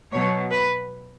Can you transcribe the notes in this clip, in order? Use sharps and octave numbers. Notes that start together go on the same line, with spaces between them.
B2 F#3 C#5
B4